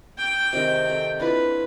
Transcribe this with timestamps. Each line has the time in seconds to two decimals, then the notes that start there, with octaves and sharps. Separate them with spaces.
0.18 G5
0.53 C3 D#3 G#3
0.86 C4 A4
1.20 D4 E4 F4 B4